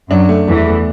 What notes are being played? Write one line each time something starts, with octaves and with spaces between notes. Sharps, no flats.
F#2 F#3 D4
A3
E2 E3 A3
A3